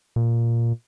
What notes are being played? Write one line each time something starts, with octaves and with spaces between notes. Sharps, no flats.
A#2